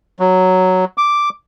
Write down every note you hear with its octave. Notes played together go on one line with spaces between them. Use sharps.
F#3
D6